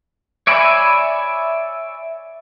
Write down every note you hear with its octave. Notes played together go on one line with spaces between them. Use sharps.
C#5 D5 E5 G#5 B5